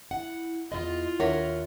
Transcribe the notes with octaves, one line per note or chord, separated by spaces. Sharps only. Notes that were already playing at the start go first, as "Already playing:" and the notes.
E4 F#5
E2 C#3 F4 D#5
D#2 A#4 C#5 E5 F#5